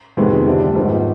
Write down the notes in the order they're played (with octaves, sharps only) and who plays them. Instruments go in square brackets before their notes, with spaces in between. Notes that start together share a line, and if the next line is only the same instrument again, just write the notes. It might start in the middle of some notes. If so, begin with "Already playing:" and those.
[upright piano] F2 C3 D#3 G#3 B3
D2 C3 G3 D4
G#1 G#2 F3 B3